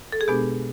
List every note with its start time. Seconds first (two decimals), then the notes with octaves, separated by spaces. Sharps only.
0.12 A4
0.21 G#4
0.28 B2 G#3 B3 D4 G4